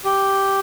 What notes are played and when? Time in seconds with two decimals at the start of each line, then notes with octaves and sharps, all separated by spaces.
0.05 G4